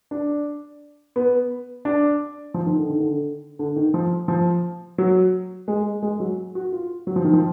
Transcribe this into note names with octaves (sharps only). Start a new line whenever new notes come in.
D4
B3
D4
F3
D#3
D3
D#3
D3
D3
D#3
F3
F3
F#3
G#3
G#3
F#3
F#4
F4
F#3
F3
D#3
F3